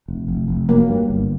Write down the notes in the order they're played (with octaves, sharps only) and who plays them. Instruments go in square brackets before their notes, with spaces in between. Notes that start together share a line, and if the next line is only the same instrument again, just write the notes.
[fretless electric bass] F1
F1
F1
[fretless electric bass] F#3 [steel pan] A#3
[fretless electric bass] G2
G1